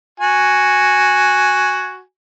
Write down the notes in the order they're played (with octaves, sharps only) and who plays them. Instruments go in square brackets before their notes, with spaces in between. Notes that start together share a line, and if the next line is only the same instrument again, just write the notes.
[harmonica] F#4 G#5